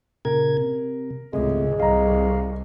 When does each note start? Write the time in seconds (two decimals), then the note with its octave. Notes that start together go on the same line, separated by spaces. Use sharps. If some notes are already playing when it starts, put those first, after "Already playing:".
0.25 A#2 C#3 A#4 G#6
0.57 C3
1.33 G#1 C#2 C3 G#3 A3
1.80 C2 D#5 F5 A#5